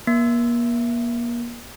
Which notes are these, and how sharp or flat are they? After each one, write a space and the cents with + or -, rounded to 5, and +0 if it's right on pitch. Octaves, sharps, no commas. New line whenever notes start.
A#3 +35